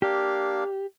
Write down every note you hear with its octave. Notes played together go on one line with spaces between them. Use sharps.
A#3 D4 G4 F5